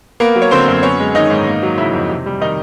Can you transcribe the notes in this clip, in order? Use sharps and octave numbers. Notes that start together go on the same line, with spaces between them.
A#3 B3 A#4
F#3
C#5
D3 C4 C5
F#2
B3 C#4 C#5
G#3
D#3 D#4 D#5
G#2
A#3
F#3
C#3 E4 E5
F2
C3
G3
D#3 D#4 D#5